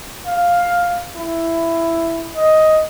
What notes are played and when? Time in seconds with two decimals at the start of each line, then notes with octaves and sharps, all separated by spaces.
0.27 F5
1.15 E4
2.36 D#5